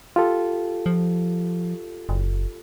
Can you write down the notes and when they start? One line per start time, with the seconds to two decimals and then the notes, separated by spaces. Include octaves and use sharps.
0.16 F4 G4 A4
0.86 F3
2.09 F#1